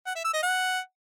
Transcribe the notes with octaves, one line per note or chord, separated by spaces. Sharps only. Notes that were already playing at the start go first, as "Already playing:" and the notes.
F#5
E5
E6
D#5
F#5